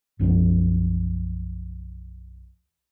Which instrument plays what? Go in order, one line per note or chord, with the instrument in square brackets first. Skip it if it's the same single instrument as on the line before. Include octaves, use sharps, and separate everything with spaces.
[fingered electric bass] B1 F#2 F3 B3